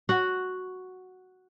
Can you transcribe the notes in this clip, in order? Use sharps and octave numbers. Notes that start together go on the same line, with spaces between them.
F#4 F#5